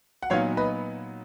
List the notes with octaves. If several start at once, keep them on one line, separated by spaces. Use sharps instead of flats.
F#5
A#2 F#3 B3 D#4 C#5 F5
B4 D#5